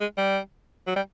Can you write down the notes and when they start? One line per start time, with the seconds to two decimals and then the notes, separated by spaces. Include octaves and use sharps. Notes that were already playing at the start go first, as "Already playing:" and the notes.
0.01 G#3
0.17 G3
0.87 F#3
0.96 G3